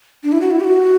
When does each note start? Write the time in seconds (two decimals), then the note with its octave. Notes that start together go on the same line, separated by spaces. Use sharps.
0.23 D4
0.32 E4
0.41 F#4
0.51 E4
0.60 G4
0.64 F#4